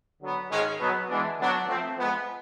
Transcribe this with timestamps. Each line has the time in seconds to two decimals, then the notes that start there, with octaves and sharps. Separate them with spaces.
0.21 D3 F#3 B3
0.50 G#2 D#3 G#3 C#4
0.79 B2 F#3 B3
1.09 E3 G#3 B3 D4
1.37 D3 F#3 B3 D4 F#4
1.66 F3 A3 C4
1.97 F3 G#3 B3